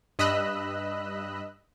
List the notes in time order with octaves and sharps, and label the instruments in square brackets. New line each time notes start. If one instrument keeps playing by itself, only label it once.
[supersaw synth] G2 D#5 B5 E6 F#6